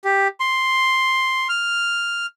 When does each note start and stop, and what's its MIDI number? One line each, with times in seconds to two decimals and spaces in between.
0.04 0.28 67
0.40 1.48 84
1.49 2.26 89